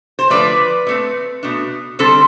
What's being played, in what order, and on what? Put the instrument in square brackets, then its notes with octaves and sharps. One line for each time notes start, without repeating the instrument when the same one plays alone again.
[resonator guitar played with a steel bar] C5
D3 F3 A3 B4 D5
B2 A3 C4
B2 A3 D4
D3 G3 C4 A4 C5